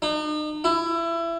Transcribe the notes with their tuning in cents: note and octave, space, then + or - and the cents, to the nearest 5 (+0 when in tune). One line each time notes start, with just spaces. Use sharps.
D#4 -40
E4 +25